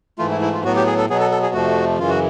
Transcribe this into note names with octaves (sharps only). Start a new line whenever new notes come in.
G#2 E3 A3 F4
E4
E4
F4
A2 F#3 B3 F#4
G4
G#4
A4
B2 F#3 B3 G#4
A4
A4
G#4
F2 C3 F3 A3 F#4
F#2 C#3 E3 F4
F#4